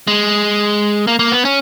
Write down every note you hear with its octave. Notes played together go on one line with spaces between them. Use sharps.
G#3
A#3
A#3
B3
C#4